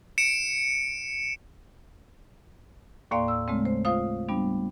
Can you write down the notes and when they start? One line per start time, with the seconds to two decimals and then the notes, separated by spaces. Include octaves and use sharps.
0.18 C#7 D7 E7
3.11 D#2 A2 A#3 D5 F5 C6
3.28 E6
3.48 C#3 G#3 A3 C4
3.65 C5
3.85 F4 C5 F5 D#6
4.29 G3 B3 D4